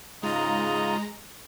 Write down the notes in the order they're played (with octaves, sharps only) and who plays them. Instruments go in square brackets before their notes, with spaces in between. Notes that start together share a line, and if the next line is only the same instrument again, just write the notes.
[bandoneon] G#2 C#3 F4 [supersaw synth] G#3 A#5 [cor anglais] D#4